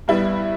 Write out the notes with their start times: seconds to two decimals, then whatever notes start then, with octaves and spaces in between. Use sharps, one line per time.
0.08 G2 G3 B3 E4